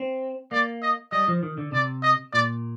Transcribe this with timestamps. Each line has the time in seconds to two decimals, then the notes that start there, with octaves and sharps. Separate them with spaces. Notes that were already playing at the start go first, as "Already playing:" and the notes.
Already playing: C4
0.51 A#3 D5
0.82 D#5
1.12 G3 D#5
1.28 F3
1.43 D#3
1.58 D3
1.72 C3 D5
2.03 D#5
2.33 A#2 D5